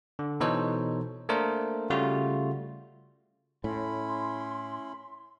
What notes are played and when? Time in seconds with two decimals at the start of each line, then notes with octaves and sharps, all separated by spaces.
0.19 D3
0.40 B2 E3 D#4 A4 C5 C#5
1.29 A3 A#3 D4 A#4 C5
1.90 C#3 G3 A3 F4 F#4
3.64 A2 C#4 E4 B5 C6